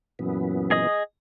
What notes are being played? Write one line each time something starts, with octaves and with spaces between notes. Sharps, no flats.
F#2 A#2 E3 B3
G#4 D#5 D#6